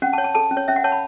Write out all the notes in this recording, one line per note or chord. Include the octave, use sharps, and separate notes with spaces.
C#4 F#5
A5
C#5
A5
A4 A5
C#4
C#5
C#4 E5
F#5
C#5 A5
B5